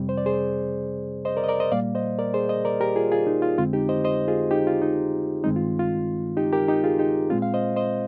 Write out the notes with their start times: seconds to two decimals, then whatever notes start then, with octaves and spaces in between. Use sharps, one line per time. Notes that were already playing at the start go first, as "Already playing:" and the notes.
Already playing: F2 C3 G3 C4
0.09 C5
0.17 D5
0.26 G#4 C5
1.25 C5 D#5
1.37 A#4 D5
1.44 D#5
1.49 A#4 D5
1.60 C5 D#5
1.72 A#2 G3 A#3 D5 F5
1.95 C5 D#5
2.18 A#4 D5
2.34 G#4 C5
2.49 C5 D#5
2.65 A#4 D5
2.80 G4 A#4
2.96 F4 G#4
3.12 F4 G#4
3.27 D#4
3.42 F4
3.58 F2 D3 G#3 C4 F4
3.73 D#4 G4
3.89 C5 D#5
4.04 C5 D#5
4.28 F4 G#4
4.51 D#4 G4
4.67 F4
4.82 D#4
5.44 G2 D#3 G#3 C4 D#4
5.56 F4
5.79 F4
6.37 D#4 G4
6.53 G4 A#4
6.68 D#4 G4
6.84 F4 G#4
6.99 D#4 G4
7.30 A#2 G#3 C4 F4
7.42 F5
7.54 C5 D#5
7.76 C5 D#5